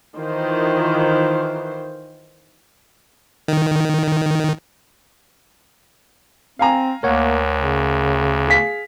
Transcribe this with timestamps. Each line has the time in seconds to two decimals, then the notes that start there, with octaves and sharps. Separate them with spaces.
0.17 D#3 E3 F4 C5
3.48 D#3
6.59 C4 F5 G#5 A#5
7.03 D2 A#3 A#4 C#5 F#5
7.55 C#3
8.48 G#4 F5 B6